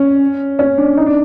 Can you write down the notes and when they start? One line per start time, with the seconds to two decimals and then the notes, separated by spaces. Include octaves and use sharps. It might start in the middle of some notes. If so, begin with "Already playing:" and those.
Already playing: C#4
0.59 C#4
0.78 D4
0.97 D#4
1.06 D4